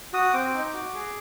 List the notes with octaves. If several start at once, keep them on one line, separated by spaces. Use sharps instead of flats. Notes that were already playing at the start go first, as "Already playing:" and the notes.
F#4 D#6
C4 D6
D#4
F#4
G#4